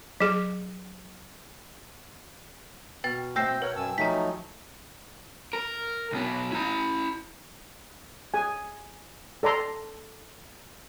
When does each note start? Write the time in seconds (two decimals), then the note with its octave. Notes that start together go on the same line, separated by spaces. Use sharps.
0.20 F#3 G#4
3.04 B2 B4 G5 F6 A6
3.36 C4 E5 G5 E6 G6 A#6 C7
3.62 A#4 B4 C#5 F#5
3.76 F#2 G#5 A5 E6
3.98 F3 F#3 A3 D#4 A#5 B6
5.53 A#4
6.12 B1 B3
6.52 E4 A#5
8.34 G#4 G#5
9.43 A4 D5 A#5 C6